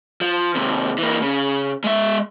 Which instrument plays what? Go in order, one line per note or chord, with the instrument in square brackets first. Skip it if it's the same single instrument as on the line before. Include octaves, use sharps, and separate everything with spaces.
[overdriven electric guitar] F3
D#2 C3
E3 A#3
C#3
G#3 E5